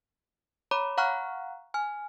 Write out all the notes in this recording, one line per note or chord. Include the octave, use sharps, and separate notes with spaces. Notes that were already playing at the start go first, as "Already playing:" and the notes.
C#5 A#5 B5 D6
F5 F#5 A#5 C#6 F6 F#6
G#5 F6